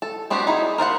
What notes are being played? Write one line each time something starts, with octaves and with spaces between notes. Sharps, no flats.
A4
B3 C4 D4 F#4 G4
D#4 E4 G#4
A#4 C5 D5 F#5